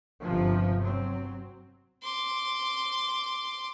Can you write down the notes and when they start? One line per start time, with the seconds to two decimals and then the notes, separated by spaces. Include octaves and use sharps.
0.23 G1 C3 F3
0.82 F#3 C4
2.03 C6 D6